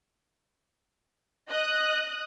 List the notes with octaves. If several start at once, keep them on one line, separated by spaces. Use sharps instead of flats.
D#5 D#6 F#6